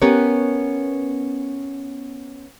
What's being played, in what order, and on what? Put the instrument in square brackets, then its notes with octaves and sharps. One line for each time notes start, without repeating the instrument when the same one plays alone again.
[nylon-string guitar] B3 C#4 G4 A#4 B4 C#5